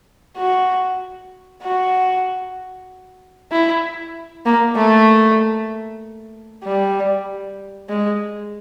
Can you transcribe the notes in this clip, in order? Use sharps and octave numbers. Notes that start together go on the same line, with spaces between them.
F#4
F#4
E4
A#3
A3
G3
G#3